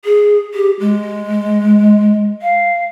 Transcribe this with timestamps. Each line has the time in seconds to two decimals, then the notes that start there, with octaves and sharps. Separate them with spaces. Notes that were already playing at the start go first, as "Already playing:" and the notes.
0.05 G#4
0.54 G4
0.80 G#3
2.42 F5